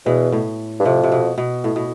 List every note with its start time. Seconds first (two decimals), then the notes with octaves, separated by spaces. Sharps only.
0.06 E2 B2
0.32 A2
0.80 G2
0.85 F2 C3
1.03 C3
1.12 B2
1.38 B2
1.64 A2
1.76 B2